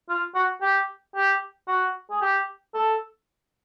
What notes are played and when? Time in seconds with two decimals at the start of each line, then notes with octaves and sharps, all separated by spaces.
0.09 F4
0.35 F#4
0.62 G4
1.16 G4
1.68 F#4
2.10 G#4
2.22 G4
2.74 A4